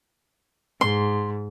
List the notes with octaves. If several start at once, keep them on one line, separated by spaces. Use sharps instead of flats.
G#2 C6